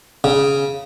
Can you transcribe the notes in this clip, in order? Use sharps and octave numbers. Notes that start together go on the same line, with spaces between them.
C#3